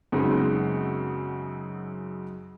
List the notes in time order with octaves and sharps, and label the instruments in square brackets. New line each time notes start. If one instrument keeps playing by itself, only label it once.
[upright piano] F#2 C#3 G#3 B3 C4 D#4